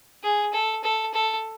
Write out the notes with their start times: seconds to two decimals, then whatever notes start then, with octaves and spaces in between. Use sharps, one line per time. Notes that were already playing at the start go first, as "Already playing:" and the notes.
0.23 G#4
0.53 A4
0.84 A4
1.14 A4